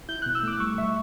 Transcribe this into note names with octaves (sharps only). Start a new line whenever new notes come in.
E4 G6
B2 F#6
E6
A3 D6
G3 C#6
B2 E5